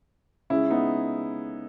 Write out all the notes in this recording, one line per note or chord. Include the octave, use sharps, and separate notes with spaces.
C#3 G#3 C#4 E4
B3 D#4